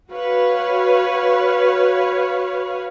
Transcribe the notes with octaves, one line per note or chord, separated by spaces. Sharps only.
F#4 B4 C#5 F5